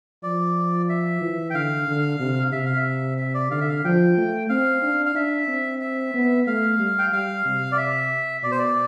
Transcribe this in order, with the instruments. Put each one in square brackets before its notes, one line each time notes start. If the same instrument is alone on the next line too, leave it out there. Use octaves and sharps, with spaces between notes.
[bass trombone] F3 [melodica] D5
[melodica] E5
[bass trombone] E3
[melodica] G5
[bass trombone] D3 [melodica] F5
[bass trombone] D3
C3
[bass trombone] C3 [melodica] E5
[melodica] F5
E5
E5
D5
[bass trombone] D3 [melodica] F5
[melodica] E5
F5
[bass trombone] F3 [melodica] G5
[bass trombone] A3
[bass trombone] C4 [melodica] F5
[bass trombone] D4
[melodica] F5
[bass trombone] D4 [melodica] E5
[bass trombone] C4
[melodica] E5
[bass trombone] B3
[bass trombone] A3 [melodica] F5
[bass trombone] G3
[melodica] G5
[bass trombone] G3 [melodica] F5
[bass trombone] C3
[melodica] D5
E5
[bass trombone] B2 [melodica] D5
[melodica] C5
D5